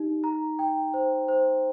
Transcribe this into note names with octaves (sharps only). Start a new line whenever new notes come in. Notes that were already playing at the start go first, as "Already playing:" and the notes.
Already playing: D#4 G4
A#5
G5
C5
C5